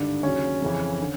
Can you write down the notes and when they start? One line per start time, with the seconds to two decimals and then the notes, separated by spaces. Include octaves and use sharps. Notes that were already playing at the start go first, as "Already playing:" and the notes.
Already playing: G#1 G2 D3 D4
0.23 D#2 C#3 F#3 C#4
0.62 F2 C#3 E3
1.01 D3